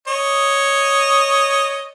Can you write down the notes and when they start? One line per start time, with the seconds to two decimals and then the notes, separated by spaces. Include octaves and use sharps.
0.07 C#5 D#5